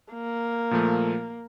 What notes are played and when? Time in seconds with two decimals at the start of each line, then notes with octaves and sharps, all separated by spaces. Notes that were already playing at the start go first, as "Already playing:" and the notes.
0.13 A#3
0.71 A#2 F3 A3